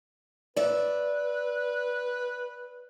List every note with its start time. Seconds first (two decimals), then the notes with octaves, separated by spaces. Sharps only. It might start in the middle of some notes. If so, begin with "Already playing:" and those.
0.56 B4 D5 E5